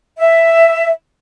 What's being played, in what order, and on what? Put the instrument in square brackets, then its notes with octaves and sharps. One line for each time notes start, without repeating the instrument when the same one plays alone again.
[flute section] E5